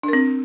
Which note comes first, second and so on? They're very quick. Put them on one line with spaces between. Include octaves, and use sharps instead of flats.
D4 A#4 C4